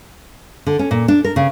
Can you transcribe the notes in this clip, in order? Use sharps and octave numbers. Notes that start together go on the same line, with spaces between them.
D3
C#4
A#2
D4
A#4
C#3